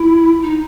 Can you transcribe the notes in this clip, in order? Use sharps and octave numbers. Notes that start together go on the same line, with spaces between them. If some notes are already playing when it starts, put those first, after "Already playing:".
Already playing: E4
D#4